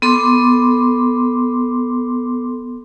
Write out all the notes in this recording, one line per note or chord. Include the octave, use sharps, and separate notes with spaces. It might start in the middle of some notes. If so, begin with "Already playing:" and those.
B3 A4 C6 D6